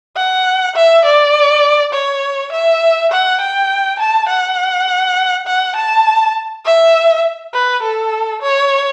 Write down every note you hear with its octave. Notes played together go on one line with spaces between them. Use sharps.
F#5
E5
D5
C#5
E5
F#5
G5
A5
F#5
F#5
A5
E5
B4
A4
C#5